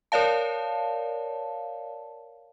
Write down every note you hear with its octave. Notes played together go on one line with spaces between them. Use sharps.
A#4 C#5 D5 F5 A5